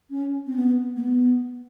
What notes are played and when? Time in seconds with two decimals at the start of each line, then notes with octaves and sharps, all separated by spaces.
0.10 C#4
0.47 C4
0.56 B3
0.96 A#3
1.01 B3